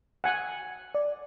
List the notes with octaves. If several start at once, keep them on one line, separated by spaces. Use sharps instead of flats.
F#5 G#5
D5